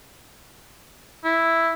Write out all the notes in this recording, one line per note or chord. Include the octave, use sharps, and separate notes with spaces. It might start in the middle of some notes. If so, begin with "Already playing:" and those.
E4